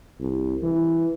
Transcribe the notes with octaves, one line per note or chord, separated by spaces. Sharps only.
C2
E3